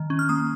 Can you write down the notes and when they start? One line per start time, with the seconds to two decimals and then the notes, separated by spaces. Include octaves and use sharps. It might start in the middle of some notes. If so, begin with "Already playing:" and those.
Already playing: D#3
0.10 C#4
0.19 F6
0.29 A#3 D#6